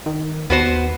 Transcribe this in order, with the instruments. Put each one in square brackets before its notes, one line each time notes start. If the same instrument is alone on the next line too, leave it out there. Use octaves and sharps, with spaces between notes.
[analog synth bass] D#3
[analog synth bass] D#2 [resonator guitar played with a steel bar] B3 F#4 C5